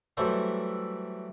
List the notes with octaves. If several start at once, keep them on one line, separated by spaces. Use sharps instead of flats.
E3 F#3 G3 A3 C5 E5